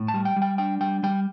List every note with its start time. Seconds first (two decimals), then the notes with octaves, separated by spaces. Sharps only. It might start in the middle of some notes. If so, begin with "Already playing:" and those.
Already playing: A2
0.08 A5
0.14 G3
0.25 G5
0.36 G3
0.42 G5
0.58 D4 G5
0.81 G3 G5
1.03 G3 G5